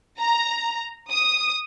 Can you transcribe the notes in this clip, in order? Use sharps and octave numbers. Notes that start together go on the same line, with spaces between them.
A#5
D#6